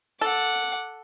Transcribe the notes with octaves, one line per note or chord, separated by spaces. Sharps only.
A4 F#5 D6